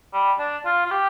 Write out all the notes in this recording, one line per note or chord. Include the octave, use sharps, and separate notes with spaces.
G3
D4
F4
F4
G4